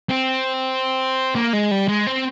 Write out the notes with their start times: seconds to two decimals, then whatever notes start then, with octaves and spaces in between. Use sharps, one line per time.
0.09 C4
1.35 A#3
1.53 G#3
1.71 G3
1.88 G#3
2.07 C4